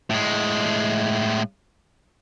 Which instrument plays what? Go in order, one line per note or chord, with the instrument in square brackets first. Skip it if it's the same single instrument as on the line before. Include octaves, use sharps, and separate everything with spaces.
[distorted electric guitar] A2 G#3